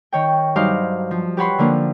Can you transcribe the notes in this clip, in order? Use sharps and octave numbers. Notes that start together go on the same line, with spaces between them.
D#3 C#5 G5
G2 F#3 D#4 C5 F5 D6
F3
G4 B4 C#5 F#5 B5 C6
D3 F3 A#3 D4